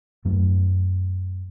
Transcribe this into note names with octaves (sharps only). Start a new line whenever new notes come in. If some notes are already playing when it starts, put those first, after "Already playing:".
F#2 F#3 A3